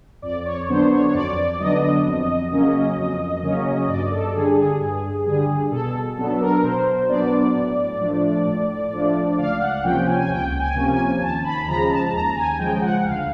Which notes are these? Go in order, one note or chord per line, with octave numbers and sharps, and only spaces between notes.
F2 D5
C#5
D3 F#3 B3 D4 C5
C#5
C#5
F2 D5
D3 F#3 B3 D4 D#5
F2
C#3 F#3 A#3 C#4
F2
C#3 F#3 A#3 C#4
G2 D5
A4
D3 G3 G#4
G#4
G2 G#4
D3 G3 G#4
B2 A4
F#3 B3 D4 A4
A#4
B2 C5
F#3 B3 D4 D5
A2
F3 A3 D4
A2
F3 A3 D4
C#2 F5
F#5
C3 F3 A#3 C#4 G5
G#5
G#5
C#2 G5
G#5
C3 F3 A#3 C#4
G#5
D#2 A5
B5
C#3 F3 G#3 A#5
A5
D#2 A#5
G#5
C#3 F3 G#3 G5
F#5
D2 F5